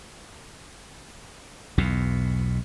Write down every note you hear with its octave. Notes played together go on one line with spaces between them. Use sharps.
B1 E2 B2